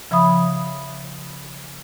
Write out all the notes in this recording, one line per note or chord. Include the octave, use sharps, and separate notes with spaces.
C#3 F3 E5 B5 D#6